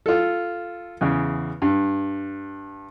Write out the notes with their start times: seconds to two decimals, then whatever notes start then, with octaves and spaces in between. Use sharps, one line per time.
0.06 F4 A4
1.01 E2 C#3
1.62 G2